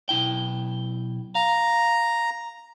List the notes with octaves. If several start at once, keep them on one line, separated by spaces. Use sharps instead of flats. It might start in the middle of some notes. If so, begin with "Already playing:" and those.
B1 E4 G5
F5 A#5